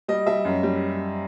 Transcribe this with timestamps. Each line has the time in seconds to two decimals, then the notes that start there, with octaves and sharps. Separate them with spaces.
0.08 G3 D#5
0.27 G3 E5
0.45 F#2
0.63 G3